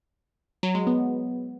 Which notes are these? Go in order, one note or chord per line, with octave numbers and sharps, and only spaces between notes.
F#3
G#3
B3